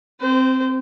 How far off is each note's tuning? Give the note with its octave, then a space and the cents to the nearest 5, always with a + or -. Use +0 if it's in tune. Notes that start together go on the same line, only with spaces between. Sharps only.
C4 +0 C5 -25